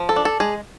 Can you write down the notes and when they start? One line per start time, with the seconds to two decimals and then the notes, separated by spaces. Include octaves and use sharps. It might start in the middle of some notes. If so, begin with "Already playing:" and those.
Already playing: F3
0.09 A4
0.16 D4
0.25 A4
0.40 G#3 G#4